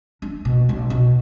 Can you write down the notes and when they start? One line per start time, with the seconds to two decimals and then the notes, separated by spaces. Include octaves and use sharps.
0.22 D4
0.45 B2
0.69 B1
0.90 B2